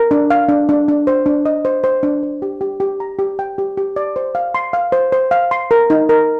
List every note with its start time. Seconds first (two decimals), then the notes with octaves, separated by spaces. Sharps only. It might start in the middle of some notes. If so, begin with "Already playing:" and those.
Already playing: A#4
0.11 D4
0.30 F5
0.49 D4
0.69 D4
0.88 D4
1.07 C5
1.26 D4
1.46 D#5
1.65 C5
1.84 C5
2.03 D4
2.23 C5
2.42 G4
2.61 G4
2.80 G4
3.00 A#5
3.19 G4
3.39 G5
3.58 G4
3.77 G4
3.96 D5
4.16 C5
4.35 F5
4.55 C6
4.73 F5
4.92 C5
5.12 C5
5.31 F5
5.51 C6
5.71 A#4
5.90 D#4
6.09 A#4